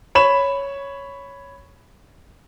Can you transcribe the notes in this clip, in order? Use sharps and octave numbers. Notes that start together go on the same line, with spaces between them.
C#5 B5 E7